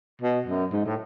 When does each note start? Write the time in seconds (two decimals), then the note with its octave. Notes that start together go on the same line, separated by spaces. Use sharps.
0.22 B2
0.47 F#2
0.72 G#2
0.86 A2